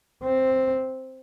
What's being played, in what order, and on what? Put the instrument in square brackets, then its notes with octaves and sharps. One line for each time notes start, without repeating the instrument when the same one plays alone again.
[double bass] C4